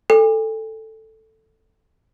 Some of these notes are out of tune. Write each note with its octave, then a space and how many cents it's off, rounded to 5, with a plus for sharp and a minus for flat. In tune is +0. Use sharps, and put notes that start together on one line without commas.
A4 +5 G#5 -45